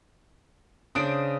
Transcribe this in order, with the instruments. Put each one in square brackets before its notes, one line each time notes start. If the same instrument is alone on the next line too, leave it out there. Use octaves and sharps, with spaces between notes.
[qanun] C#3 D4 C5 [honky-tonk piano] D#6 D7